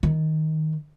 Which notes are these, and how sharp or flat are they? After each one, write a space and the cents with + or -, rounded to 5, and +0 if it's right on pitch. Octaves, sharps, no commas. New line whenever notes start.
D#3 +10